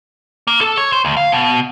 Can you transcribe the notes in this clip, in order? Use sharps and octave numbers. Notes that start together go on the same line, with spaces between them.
A#3
A4
C#5
C5
D2
F5
B2